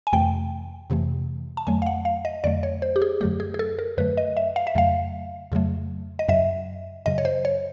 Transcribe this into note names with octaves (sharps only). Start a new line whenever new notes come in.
G#5
F2 C3 E3 A3 G5
F2 C3 E3 A3
A5
F2 D3 F#3 A3 G#5
F5
F#5
F5
D#5
F2 D3 F#3 A3 D5
C#5
C5
G4
G#4
F#2 D3 F#3 A3 G4
G#4
G#4
A4
A#4
F#2 D3 F#3 A3 B4
D#5
E5
F5
E5
F2 C#3 F#3 A3 F5
F2 C#3 F#3 A3
D#5
F#2 C#3 F#3 E5
F#2 C#3 F#3 D#5
C#5
C5
C#5